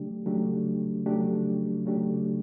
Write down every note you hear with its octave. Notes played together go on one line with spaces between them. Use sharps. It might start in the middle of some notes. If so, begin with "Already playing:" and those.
Already playing: C#3 F#3 A3 D4 G4
C#3 F#3 A3 D4 G4
C#3 F#3 A3 D4 G4
C#3 F#3 A3 D4 G4